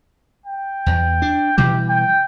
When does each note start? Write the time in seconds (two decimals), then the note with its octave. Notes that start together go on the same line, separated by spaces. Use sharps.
0.46 G5
0.86 E2
1.22 D4
1.58 B2 E3 G3 G4
1.89 G5